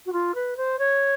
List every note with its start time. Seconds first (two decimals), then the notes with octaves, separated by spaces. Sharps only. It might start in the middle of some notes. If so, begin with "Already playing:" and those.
0.06 F#4
0.12 F4
0.34 B4
0.57 C5
0.79 C#5